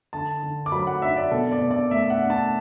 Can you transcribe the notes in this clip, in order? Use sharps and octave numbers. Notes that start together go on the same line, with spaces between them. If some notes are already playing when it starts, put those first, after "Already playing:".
D3 A5
D3
D6
F#3 B5
F#5
D4 E5
D5
B2 A4
D5
B2
D5
A3 E5
F#5
D4
A5